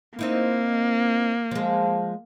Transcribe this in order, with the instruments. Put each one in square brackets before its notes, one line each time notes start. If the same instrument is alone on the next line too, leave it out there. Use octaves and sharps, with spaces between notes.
[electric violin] A#3 [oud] C4 D#4 E4
[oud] F3 G#3